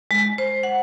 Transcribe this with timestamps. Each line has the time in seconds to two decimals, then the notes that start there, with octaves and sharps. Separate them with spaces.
0.11 G#3
0.38 C5
0.63 F#5